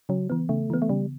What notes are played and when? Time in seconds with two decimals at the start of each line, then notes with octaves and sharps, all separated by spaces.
0.09 C#3 F#3
0.30 E3 B3
0.49 C#3 A3
0.70 E3 B3
0.82 A3
0.89 C#3 G3